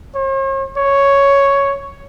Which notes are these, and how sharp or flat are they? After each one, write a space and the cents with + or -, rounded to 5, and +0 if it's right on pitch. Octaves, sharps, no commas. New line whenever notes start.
C#5 -45
C#5 +5